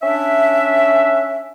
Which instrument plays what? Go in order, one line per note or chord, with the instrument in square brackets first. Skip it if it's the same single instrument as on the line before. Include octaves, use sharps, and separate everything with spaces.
[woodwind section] C#4 D4 E5